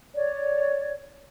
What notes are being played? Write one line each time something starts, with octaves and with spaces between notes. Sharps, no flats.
C#5 D5